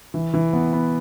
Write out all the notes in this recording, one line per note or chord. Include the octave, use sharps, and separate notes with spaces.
E3
E3
B3
B3